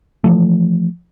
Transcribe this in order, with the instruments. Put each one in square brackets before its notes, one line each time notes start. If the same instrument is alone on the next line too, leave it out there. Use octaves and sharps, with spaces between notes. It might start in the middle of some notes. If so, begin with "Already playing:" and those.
[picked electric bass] E3 F3 A3